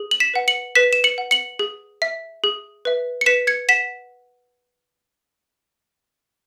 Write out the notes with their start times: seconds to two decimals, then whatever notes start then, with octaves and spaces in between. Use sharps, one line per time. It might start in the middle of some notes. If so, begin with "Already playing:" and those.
Already playing: G#4
0.11 F#7
0.20 B6 E7
0.34 B4 F#5
0.48 C#7 F#7
0.75 B4 B6 E7
0.93 E7
1.04 C#7 F#7
1.18 F#5
1.31 C#7 F#7
1.59 G#4
2.02 E5
2.44 G#4
2.85 B4 E5
3.21 C#7
3.26 B4 B6 E7
3.47 G#6 C#7
3.69 F#5 B6 E7